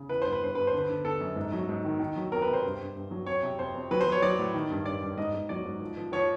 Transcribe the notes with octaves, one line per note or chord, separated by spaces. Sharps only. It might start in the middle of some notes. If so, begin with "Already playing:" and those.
Already playing: C#3
E3 B4
G2 C5
B4
G2 C5
G2 B4
C5
D3
B4
D3
D3 A4
F#2
G#2
F#3
G#2
D#3
D#3
F#3
F2 A#4
B4
C3
C5
G2
G2
G2
F#3
F2 C#5
C3
F2 C5
F2
F#3 B4
C5
F#3
C#5
F#3 D5
A2
D#3
G2
G2 D5
G2
G#2 D#5
G#2
F#3 D5
G#2
F3
F3
F3 C#5